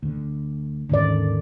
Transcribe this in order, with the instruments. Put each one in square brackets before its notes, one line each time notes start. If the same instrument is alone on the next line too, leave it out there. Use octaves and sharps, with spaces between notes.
[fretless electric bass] D2 D3
[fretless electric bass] D#1 G#2 C#4 [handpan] D3 D#3 D5